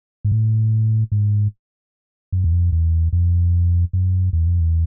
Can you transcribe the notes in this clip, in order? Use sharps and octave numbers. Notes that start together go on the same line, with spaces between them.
G#2
A2
G#2
F#2
E2
F2
E2
F2
F#2
E2
F2
E2